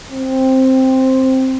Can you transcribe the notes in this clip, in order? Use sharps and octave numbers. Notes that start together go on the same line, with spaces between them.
C4